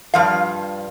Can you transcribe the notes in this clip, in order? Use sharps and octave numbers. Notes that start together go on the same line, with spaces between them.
G2 F3 F5